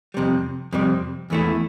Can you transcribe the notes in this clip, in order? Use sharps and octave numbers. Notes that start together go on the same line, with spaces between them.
F2 C3 G3
F2 C3 G3
E2 E3 A3 E4